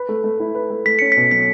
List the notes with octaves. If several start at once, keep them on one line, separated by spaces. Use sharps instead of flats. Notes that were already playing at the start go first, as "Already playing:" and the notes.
Already playing: B4
A3
A3
E4
B4
A3
A3 B6
C#4 C#7
B2 B6
F#3 B6